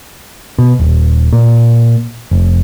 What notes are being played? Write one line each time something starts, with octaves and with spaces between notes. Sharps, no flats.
B2
D#1
A#2
F1